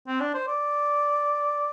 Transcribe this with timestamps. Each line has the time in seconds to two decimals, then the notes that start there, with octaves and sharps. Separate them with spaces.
0.07 C4
0.20 D4
0.34 C5
0.47 D5